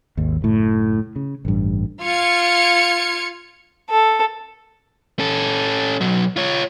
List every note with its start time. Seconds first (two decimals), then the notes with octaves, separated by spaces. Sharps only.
0.17 G#1 D#2
0.41 F#1 A2
1.16 C#3
1.45 A1 G2
2.04 F4 F6 G#6 C#7
3.90 A4
5.19 C#4 A4
6.01 B1 F#3
6.36 F4 C#5